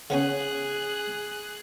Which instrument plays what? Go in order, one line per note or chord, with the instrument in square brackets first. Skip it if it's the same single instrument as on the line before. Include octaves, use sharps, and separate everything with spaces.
[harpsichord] C#3 B3 C#4 [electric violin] G#4 F#6